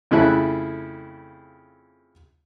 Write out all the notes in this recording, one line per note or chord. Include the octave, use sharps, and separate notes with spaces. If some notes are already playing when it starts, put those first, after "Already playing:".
F2 C#3 A3 E4 F#6